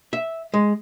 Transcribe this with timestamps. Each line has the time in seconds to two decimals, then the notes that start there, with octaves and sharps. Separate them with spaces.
0.13 E5
0.54 G#3